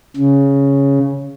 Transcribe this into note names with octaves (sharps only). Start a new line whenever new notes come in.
C#3